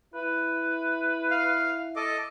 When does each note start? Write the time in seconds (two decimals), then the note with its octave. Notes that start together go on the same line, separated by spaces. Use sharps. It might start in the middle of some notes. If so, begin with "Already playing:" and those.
0.15 E4 B4
1.31 F5
1.96 A4 D#5 D6